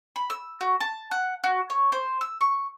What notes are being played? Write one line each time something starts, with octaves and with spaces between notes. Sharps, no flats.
B5
E6
F#4
A5
F#5
F#4
C#5
C5
E6
C#6